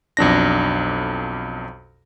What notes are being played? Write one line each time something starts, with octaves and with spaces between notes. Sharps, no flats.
B1 F2 D4 A#6